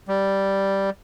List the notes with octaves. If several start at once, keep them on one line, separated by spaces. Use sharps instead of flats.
G3